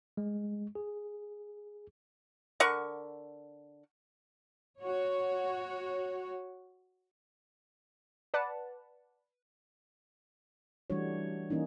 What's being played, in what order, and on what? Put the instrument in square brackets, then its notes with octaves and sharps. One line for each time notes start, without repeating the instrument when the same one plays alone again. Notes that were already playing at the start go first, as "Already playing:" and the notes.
[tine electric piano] G#3
G#4
[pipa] D3 A#4 F#5 C#6
[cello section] F#4 C#5
[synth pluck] B4 D5 F#5 A5
[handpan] E3 G3 A3 D4 F#4 C#5
E3 A#3 C#4 D#4